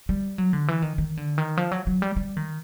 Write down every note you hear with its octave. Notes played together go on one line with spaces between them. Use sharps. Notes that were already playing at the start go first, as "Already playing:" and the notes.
G3
F#3
D3
E3
D#3
D#3
D3
D#3
F3
F#3
F#3
G3
G3
D#3